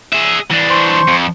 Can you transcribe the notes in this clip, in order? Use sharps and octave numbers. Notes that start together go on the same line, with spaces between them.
G#4 E5
E3 D4
C5 C6 C#6
F2